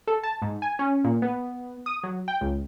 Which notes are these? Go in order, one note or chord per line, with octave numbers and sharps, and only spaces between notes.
A4
A5
G#2
G#5
C#4
A#2
B3
D#6
F#3
G5
C#2